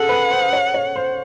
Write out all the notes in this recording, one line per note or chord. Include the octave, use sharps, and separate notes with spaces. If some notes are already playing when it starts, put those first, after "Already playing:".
Already playing: G#4 A4 F#5
B4
C5
C#5
C#5
C5